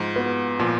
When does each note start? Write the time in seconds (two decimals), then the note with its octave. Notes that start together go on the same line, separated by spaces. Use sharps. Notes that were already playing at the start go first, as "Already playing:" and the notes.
Already playing: G#2 F3
0.16 B3 F#4 B4
0.59 A#2 F3